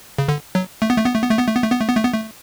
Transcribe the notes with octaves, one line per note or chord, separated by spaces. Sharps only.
C#3
D3
F#3
A3
B3
A3
B3
A3
B3
A3
B3
A3
B3
A3
B3
A3
B3
A3
B3
A3